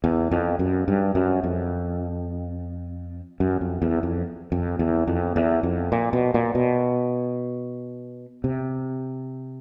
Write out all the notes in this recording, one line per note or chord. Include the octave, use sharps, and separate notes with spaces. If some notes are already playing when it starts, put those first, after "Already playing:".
E2
F2
F#2
G2
F#2
F2
F#2
F2
E2
F2
F2
E2
F2
E2
F2
A#2
B2
A#2
B2
C3